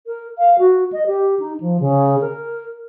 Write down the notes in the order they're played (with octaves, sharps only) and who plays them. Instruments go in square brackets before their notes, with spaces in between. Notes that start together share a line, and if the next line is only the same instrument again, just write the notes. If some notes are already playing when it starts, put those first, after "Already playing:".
[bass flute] A#4
F5
F#4
D#5
G4
D#4
F3
C#3
A#4